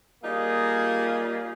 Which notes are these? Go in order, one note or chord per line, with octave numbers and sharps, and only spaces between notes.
G3 A#3 D#4 F4 G#4